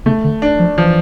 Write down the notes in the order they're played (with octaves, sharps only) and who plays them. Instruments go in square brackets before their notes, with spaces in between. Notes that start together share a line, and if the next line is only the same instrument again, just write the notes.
[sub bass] C#3 [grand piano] A3
[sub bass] D3
[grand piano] D4
[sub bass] F3
[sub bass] E3 [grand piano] F3